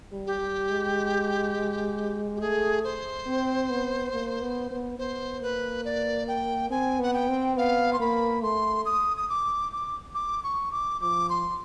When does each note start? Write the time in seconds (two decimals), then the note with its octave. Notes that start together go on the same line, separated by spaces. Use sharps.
0.12 G3
0.27 G4
0.40 G3
0.70 G#3
2.37 G4
2.40 A3 G#4
2.84 C5
3.26 C4
3.70 B3
4.12 A#3
4.42 B3
4.71 B3
4.99 B3 C5
5.42 A#3 B4
5.85 D5
6.28 G5
6.70 C4 G#5
6.99 B3 F#5
7.14 G5
7.29 C4
7.57 B3 F5
7.93 C6
8.00 A#3 B5
8.42 A3 C6
8.86 D#6
9.17 D#6
9.30 D6
9.73 D6
10.15 D6
10.44 C#6
10.72 D6
11.01 F3 D6
11.30 C6